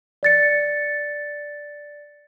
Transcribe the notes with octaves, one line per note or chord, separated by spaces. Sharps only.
D5 A6 C#7